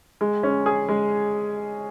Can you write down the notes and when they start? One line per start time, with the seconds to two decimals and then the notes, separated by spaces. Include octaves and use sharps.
0.21 G#3
0.43 C#4
0.66 G#4
0.89 G#3